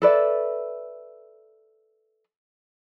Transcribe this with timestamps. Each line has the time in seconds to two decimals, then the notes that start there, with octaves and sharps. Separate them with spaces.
0.02 A4 B4 D5 E5